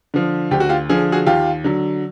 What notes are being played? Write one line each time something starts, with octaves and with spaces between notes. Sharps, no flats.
D3 F3
D2 G4
F#4
F4 G4
D3 F3 G#4
F#4 G#4
D#2 F4 G4
D3 F#3